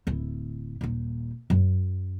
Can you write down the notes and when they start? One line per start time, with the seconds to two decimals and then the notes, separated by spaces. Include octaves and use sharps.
0.07 D1 E4
0.81 D#1 D#4
1.50 F#2